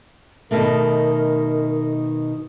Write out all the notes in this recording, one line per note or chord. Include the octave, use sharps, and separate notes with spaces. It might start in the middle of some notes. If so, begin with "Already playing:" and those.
B2 D#3 A3 A#4